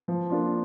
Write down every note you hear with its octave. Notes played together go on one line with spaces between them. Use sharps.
F3
A#3 D4 F4